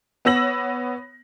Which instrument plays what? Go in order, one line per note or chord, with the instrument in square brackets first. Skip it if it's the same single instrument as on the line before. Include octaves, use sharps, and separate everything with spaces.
[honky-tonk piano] B3 C#5 E6 A#6 F#7